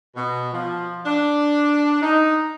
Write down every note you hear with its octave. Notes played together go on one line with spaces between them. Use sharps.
B2
F3
D4
D#4